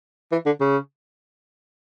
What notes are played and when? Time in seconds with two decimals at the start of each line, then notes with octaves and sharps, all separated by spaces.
0.32 E3
0.46 D3
0.60 C#3